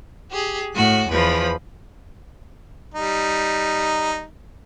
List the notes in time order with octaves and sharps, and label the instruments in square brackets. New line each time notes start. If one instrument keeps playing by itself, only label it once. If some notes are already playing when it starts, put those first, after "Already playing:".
[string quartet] G4 G#4
A2 F#4 F#6
E2 F3 B4 B5
[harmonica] G3 D#4